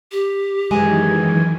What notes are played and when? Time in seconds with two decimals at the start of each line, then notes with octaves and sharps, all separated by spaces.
0.12 G4
0.71 F#2 D#3 E3 G#3 G#5